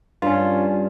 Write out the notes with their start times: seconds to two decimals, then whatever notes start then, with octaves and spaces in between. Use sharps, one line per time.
0.22 G2 C#4 F4